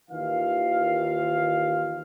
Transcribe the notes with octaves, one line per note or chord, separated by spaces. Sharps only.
D#2 D#3 E3 F4 F5